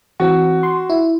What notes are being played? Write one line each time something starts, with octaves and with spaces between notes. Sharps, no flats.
E3 C4 F#4
C6
E4